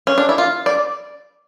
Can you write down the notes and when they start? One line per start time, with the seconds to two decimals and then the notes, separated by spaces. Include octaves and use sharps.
0.07 C#4
0.18 D4
0.29 E4
0.38 F4
0.66 D5